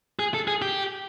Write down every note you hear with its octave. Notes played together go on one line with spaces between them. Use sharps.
G#4
A4
G#4
G4